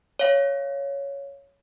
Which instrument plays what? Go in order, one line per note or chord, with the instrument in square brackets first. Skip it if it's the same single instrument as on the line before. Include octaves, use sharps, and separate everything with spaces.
[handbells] C#5 F5